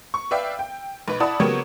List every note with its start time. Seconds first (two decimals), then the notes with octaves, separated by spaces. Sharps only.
0.14 C#6
0.31 B4 D5 E5 F5 G5
0.59 G5
1.08 B1 B4
1.20 E4 D5 F#5 A5 B5 D#6
1.40 C#3 F#3 A#3 B3 G4 C#5